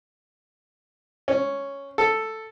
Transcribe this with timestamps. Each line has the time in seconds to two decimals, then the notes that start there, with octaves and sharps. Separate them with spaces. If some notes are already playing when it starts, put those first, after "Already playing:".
1.28 C#4
1.98 A4